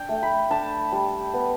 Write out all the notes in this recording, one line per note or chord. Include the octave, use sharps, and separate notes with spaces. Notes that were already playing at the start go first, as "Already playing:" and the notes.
Already playing: D4 G5
A3
B5
D4 A5
G3
B3